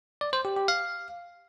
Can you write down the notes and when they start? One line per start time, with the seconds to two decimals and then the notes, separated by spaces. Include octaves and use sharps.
0.21 D5
0.33 C5
0.45 G4
0.56 G4
0.68 F5